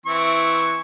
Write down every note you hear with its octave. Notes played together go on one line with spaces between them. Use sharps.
E3 C4 E4 C#6